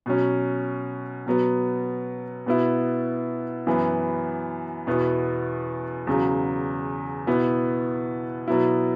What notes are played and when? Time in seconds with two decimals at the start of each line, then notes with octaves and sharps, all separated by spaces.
0.06 B2 F#3 C#4
1.26 B2 F#3 B3
2.46 B2 B3 E4
3.67 F#2 E3 B3
4.87 E2 B2 B3 E4
6.07 E2 C#3 F#3
7.27 B2 B3 E4
8.48 B2 F#3 B3 E4